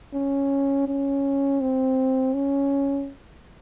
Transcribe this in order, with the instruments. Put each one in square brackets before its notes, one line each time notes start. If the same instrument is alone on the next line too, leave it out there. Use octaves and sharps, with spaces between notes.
[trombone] C#4
C#4
C4
C#4